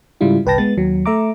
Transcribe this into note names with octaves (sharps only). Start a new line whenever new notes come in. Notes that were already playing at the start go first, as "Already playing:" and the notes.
G#2 C#3 G3 E4 F4
G1 C2 B4 G5 A5 A#6
G#3 B3 A6
D#2 F#3
A3 E5 A#5 D6